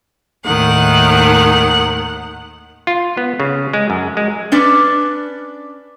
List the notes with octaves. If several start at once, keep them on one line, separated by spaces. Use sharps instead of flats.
D#2 A2 D#3 F#5
F4
B3
C#3
G#3
F#2
G#3
C#4 D4 B4 D5